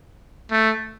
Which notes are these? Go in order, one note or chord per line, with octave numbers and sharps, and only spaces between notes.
A3